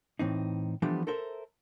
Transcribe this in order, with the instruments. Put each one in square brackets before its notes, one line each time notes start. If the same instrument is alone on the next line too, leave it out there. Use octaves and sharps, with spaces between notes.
[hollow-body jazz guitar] A2 E3 C4 D#4
E3 F3 G3 A3 B3 D4
A4 A#4 C5 E5